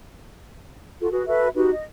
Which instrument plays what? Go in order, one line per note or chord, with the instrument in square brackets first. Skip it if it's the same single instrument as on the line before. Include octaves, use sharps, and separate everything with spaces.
[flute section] F4 F#4 A4
F#4 G#4 B4
F#4 A4 B4 E5
D#4 F#4 G4 B4
D#5